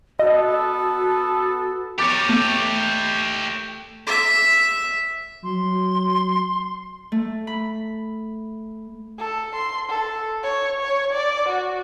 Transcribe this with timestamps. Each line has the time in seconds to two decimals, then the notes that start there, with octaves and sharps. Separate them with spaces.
0.19 B3 F#4 A4 D#5
1.99 G4 C#5 D6 A6
2.29 A3
4.07 E5
5.44 F#3 C6
7.12 A3
7.47 B5
9.19 A4
9.55 C6
9.89 A4
10.43 C#5
10.81 C#5
11.13 D5
11.48 F#4